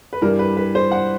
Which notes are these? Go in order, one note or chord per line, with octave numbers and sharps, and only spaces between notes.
B4
G2 E3 G3 A#4
B4
B4
C5
F#5